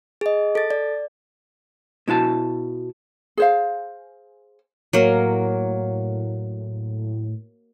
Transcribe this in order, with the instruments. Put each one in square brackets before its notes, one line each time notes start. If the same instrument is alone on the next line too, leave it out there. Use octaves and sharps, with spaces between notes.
[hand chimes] G#4 D#5
A4 A6
D5
[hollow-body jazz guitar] B2 E4 F#4 A5
[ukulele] G#4 C5 F5
[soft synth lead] A2 [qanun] F#3 A#3